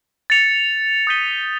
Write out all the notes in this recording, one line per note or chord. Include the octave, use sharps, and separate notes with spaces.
A6 C#7 F7
D#6 G6 B6 D#7 G7